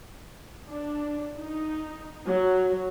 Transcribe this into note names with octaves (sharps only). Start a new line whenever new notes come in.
D4
D#4
F#3